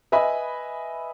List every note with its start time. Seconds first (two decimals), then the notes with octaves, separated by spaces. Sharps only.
0.12 B4 D#5 E5 G#5 B5